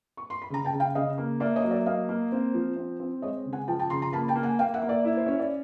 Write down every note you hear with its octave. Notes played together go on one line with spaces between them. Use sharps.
C#6
C6
B5
C#3 A#5
G5 A5
C#3
F5 G5
C#3 D#5 F5
A#3
A#3 D5 E5
C#5 D#5
F#3
D5 E5
A#3 D#5 F5
A#3
C4
F3
C4
C4
G#3 C#5 D#5
C#3
F#5 G#5
F3 G5 A5
G5 A5
C#3 A#5 C6
A#5 C6
A#3 A5 B5
G5 A5
A#3
F#5 G#5
A#3 F5 G5
E5 F#5
A#3
D5 E5
E4
C5
C#4 C#5
D5